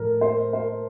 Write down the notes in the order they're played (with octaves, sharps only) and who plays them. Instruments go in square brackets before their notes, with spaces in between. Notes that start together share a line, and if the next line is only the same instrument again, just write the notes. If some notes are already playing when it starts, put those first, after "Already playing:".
Already playing: [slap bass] A2 F3 A3 [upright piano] A4 A#4
[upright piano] C5
C5